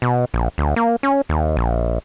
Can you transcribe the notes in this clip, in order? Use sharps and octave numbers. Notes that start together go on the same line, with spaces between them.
B2
A#1
D2
A#3
C#4
D#2
A#1